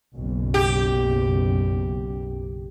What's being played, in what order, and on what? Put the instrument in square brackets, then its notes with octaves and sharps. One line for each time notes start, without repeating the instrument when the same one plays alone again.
[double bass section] F#1 B1
[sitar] G4